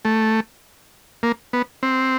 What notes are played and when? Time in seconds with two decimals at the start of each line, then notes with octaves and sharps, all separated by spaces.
0.05 A3
1.23 A#3
1.53 B3
1.83 C4